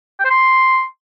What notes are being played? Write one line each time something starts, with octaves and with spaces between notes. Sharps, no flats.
G5
C5
C6